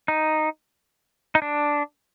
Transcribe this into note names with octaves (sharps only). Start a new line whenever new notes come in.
D#4
D#4
D4